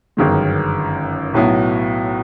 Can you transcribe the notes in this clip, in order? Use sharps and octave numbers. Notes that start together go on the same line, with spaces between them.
G1 F#2 D#3 G#3
B1 A2 F#3 B3 E4